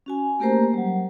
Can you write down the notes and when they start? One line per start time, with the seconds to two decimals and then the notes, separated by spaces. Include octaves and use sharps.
0.06 C#4 F#4 G#5
0.40 A3 A#3 G4 A#4 C5 A#5
0.74 F#3 G3